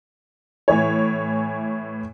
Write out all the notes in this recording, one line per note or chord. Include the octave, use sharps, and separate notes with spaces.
A2 E3 C#5